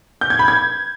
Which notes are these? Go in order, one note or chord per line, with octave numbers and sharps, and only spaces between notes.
G6
G#6
B5
G#6